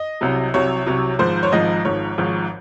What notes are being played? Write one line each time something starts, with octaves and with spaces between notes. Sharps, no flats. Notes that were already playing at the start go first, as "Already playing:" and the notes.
Already playing: D#5
C2 C3 F#3
C2 C3 F#3 C#5
C2 C3 F#3
G#1 G#2 F3 C5
C#5
G#1 G#2 F3 D#5
G#1 G#2 F3 C#5
G#1 G#2 F3